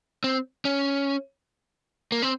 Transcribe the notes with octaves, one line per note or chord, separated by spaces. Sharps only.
C4
C#4
A#3
C4